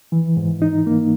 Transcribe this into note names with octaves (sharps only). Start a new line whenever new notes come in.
E3
G#2
D#4
A#3